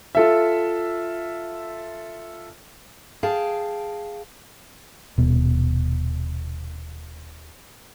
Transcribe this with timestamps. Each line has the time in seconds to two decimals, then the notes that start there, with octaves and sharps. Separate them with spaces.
0.15 F4 A4 E5
3.23 G#4 F5 G5 A5
5.18 D#1 B2